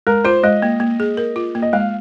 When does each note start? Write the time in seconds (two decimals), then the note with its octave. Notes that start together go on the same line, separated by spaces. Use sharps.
0.07 G#3 A#4
0.24 F4 C5
0.43 G#3 D#5
0.62 A#3
0.80 A#3
1.00 G#4
1.17 A#4
1.36 F4
1.55 A#3
1.62 D#5
1.73 G#3 F5